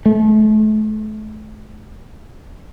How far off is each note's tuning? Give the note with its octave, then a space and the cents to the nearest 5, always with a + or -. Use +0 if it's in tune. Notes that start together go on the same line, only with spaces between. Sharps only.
A3 -40